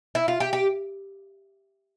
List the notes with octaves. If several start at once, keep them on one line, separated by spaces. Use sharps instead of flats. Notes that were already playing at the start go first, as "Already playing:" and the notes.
E4
F4
G4
G4